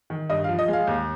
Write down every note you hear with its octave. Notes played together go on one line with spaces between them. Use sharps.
D#3
G2 D#5
F5
F3
D#5
G#3 F5
D#2